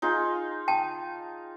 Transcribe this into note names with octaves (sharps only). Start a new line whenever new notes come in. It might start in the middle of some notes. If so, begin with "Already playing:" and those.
D#4 F4 G#4
G5 A5